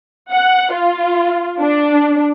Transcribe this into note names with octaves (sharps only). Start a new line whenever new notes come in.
F#5
F4
D4